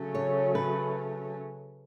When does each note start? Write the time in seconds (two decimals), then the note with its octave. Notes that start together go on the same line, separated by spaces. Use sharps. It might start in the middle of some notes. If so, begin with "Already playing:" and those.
Already playing: C#3 F#3 A3 C#4
0.15 C#5
0.55 B4